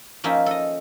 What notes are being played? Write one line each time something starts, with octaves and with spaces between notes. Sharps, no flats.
F3 A#3 C#4 D#4 E5
A4 D#5